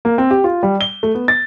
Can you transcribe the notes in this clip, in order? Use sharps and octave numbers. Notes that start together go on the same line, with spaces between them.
A#3
C4
G4
F4
G3
G7
A3
B3
A6